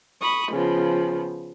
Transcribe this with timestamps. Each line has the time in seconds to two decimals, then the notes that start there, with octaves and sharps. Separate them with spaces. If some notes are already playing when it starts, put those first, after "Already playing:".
0.21 B5 C#6 D#6
0.51 C#3 F3 B3